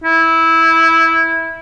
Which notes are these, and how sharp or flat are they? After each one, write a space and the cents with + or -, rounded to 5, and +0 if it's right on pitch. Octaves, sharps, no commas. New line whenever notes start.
E4 -10